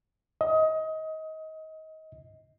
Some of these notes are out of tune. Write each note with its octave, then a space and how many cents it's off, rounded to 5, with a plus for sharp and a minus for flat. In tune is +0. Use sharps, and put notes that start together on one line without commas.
D#5 +25